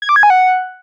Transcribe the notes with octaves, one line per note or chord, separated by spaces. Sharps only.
G#6
D6
G#6
G#5
F#5